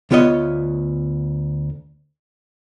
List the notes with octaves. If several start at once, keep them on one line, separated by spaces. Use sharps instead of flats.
D2 B3 F4 C#5 D#5